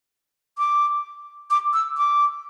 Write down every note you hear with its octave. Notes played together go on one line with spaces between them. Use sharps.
D6
D6
E6
D6